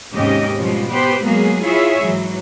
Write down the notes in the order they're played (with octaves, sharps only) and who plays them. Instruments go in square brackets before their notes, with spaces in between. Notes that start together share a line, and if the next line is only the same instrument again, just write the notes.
[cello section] D#2 G#2 C3 C#4 G4 D#5
B2 F3 G3 G#3
B3 G4 B4 C5
F#3 G#3 A#3 B3 G#4
E4 F4 G#4 C#5 E5
G#2 E3 F#3